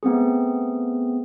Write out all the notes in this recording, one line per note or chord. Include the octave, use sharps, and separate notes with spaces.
A3 B3 C4 G#4